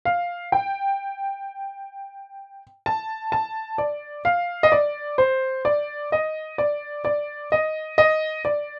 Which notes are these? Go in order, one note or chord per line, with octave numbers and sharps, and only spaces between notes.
F5
G5
A5
A5
D5
F5
D#5
D5
C5
D5
D#5
D5
D5
D#5
D#5
D5